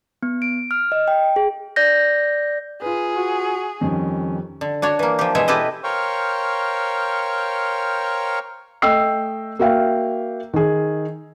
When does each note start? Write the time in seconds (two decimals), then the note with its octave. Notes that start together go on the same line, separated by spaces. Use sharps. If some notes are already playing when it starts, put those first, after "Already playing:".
0.23 B3
0.42 D7
0.71 F6
0.92 D#5
1.08 G5
1.36 G#4
1.76 D5 G6 A#6
2.82 F4 G#4 B4
3.16 F#4
3.81 F2 D#3 G3 C#4
4.61 D3
4.82 D4 F#4 C#5
4.99 E3 A#3
5.19 F3 G4
5.35 B2 E3 G#3 G#4 E5
5.48 E4 G4 A4 B4 D#5
5.84 A#4 C5 C#5 F5 G5 C#6
8.82 A3 D#5 G5 E6 C7
9.59 A#3 F#4 E5 F5 G5
10.53 D#3 G#4